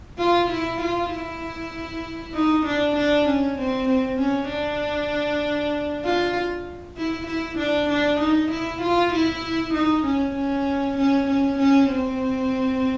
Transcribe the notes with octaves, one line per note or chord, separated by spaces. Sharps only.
F4
E4
F4
E4
D#4
D4
D4
C#4
C4
C4
C#4
D4
F4
E4
E4
D4
D4
D#4
E4
F4
E4
D#4
C#4
C#4
C#4
C#4
C#4
C4